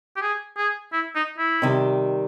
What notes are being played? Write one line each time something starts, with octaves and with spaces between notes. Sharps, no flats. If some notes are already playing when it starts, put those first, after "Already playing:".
G4
G#4
G#4
E4
D#4
E4
C3 D#3 G3